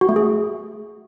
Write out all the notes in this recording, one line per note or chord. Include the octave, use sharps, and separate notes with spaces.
F#4
A3
G#4